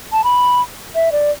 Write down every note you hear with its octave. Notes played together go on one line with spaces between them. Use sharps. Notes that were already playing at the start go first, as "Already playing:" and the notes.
A5
B5
E5
D5